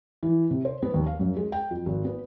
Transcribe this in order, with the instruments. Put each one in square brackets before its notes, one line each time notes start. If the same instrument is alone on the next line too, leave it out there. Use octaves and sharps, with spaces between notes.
[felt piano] E3
C3
C5
B3
D#2
F5
F#2
G#3
G5
F2
G#1
B3